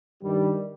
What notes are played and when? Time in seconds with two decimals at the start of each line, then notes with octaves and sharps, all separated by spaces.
0.23 G2 D#3 G3